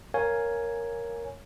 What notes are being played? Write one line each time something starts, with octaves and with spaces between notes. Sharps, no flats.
A#4 C#5 F5 G#5